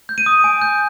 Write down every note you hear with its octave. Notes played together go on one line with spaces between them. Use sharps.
G6
D#7
D#6
G#5
G6